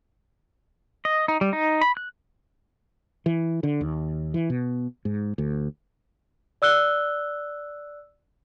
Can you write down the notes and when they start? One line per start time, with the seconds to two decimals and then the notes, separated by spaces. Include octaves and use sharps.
1.05 D#5
1.28 D#4
1.41 G3
1.53 D#4
1.81 B5
1.97 F#6
3.26 E3
3.63 D3
3.81 D#2
4.34 E3
4.50 B2
5.05 G#2
5.38 D2
6.62 D5 E6 F#6 G7